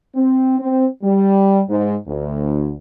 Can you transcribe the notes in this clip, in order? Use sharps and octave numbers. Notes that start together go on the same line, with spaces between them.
C4
C4
G3
G#2
D2